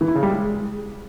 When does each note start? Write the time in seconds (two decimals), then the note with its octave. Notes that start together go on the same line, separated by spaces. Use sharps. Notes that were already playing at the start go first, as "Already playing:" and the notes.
0.01 E3
0.08 E4
0.15 C#3
0.23 G3
0.30 G#3